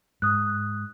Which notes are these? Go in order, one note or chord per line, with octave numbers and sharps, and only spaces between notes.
G#2 D#6 F#6